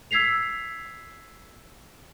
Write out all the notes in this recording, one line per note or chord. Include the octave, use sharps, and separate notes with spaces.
E6 G#6 B6 C7 F7